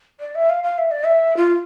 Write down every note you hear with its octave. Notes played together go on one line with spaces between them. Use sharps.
D5
E5
F5
F5
E5
D5
E5
F4